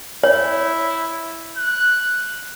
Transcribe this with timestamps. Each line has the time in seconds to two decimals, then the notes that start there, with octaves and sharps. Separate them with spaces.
0.24 E4 C#5
1.57 F#6